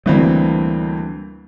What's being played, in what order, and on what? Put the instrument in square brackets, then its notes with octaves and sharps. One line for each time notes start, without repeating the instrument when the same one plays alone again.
[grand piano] D2 E3 C4 [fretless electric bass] G3 A#3